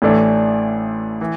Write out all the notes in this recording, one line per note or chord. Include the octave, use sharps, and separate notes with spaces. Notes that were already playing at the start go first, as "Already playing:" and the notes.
A1 A2 E3 A3 D4
E3